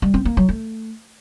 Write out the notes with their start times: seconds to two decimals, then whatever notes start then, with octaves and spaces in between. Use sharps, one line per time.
0.02 G3
0.14 C4
0.25 A#3
0.37 F#3
0.49 A3